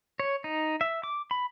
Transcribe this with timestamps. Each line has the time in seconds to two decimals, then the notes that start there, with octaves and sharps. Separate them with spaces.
0.20 C#5
0.44 D#4
0.81 E5
1.03 D6
1.31 B5